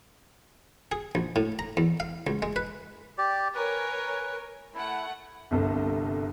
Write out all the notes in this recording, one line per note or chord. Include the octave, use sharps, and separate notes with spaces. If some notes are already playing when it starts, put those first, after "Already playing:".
G#4
A#1
A2
A#5
E2
F5
C#2
G#3
B4
G4 D5
A#4 B4 C#5 G#5
A3 E4 F#5
G1 C2 A4